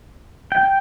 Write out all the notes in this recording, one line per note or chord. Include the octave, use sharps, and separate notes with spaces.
G5